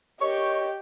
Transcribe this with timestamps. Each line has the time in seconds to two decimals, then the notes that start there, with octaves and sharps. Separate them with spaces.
0.21 G4 A#4 C#5 D#5 G5 C#6